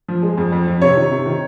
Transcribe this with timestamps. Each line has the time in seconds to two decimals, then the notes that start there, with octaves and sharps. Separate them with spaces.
0.08 F3
0.23 G#3
0.37 F2
0.52 F2
0.67 F2
0.82 C3 C#5
0.97 D#3
1.11 C3
1.26 D#3